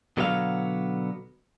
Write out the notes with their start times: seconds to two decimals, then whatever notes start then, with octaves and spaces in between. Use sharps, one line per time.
0.17 B2 D3 F#3 B3 D#5 F5